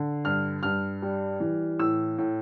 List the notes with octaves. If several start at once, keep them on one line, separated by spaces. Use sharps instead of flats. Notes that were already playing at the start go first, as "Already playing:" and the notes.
Already playing: D3
G2 F6
G2 F6
G3
E3
A2 E6
A2